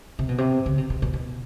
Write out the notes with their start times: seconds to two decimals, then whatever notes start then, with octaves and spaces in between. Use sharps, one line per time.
0.19 C3
0.29 B2
0.38 C3
0.66 C#3
0.78 C3
0.90 B2
1.02 B2
1.13 B2